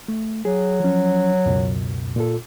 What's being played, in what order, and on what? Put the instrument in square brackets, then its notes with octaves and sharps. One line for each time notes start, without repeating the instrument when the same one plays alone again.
[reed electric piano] A3
[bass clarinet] F#3 [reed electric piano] G#4
[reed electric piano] F3 C#4
C#2 F#2 B2
A#2 F4 A4